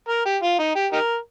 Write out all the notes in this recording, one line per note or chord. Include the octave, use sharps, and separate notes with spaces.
A#4
G4
F4
D#4
G4
D#4 G4 A#4